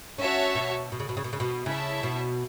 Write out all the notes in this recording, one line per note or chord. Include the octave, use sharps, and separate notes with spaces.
C#4 F#4 C#5 E5 A5
B2
B2
C#3
B2
C#3
B2
C#3
B2
C#3 E4 C#5 E5 A5
B2